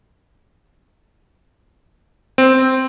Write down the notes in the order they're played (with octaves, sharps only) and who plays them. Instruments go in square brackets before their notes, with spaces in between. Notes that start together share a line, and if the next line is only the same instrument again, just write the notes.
[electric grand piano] C4